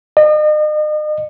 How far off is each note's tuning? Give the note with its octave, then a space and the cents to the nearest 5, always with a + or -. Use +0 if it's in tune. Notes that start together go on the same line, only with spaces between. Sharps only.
D#5 -40